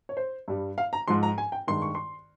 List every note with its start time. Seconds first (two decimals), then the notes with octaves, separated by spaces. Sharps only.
0.09 C#5
0.17 C5
0.48 G2 G3
0.78 F5
0.93 A#5
1.08 G#2 F3 G#3 C6
1.23 A#5
1.38 G#5
1.52 G5
1.67 G2 D#3 G#3 C6
1.82 C#6
1.95 C6